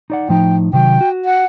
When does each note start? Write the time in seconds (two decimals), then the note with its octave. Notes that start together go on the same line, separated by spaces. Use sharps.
0.10 D#4 D5 F#5
0.29 A2 F3 D#4 G5
0.73 C3 D#3 F#3 G5
1.01 F#4
1.25 F#5